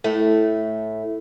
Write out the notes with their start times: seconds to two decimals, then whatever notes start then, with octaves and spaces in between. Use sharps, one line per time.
0.04 A2 A3